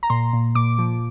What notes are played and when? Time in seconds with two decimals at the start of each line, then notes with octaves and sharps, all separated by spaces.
0.03 A#5
0.10 A#2 C6
0.33 A#2
0.55 A#2 D6
0.78 F3